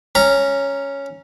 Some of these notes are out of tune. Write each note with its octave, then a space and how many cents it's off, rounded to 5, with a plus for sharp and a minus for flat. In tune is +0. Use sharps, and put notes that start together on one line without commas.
C#4 +0 A#5 +0